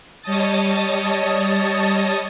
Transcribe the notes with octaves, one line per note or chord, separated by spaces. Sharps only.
G3 C#5 D#5 A5 D#6 A6